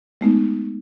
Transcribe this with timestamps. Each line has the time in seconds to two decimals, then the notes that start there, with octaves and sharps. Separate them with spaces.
0.21 G#3 A3 B3 D#4